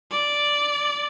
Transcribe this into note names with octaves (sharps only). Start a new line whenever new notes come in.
D5